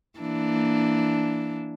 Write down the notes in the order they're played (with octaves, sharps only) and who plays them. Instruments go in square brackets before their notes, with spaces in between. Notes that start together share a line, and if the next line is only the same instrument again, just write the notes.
[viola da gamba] E3 A#3 D4